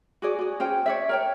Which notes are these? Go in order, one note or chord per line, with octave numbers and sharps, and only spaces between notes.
F#4 G#4 D5
F#4 G#4
C#4 C5 G5
C#5 D5 E5
A#4 C#5 G5